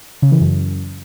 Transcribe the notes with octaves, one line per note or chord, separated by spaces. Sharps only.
C#3
E3
F#2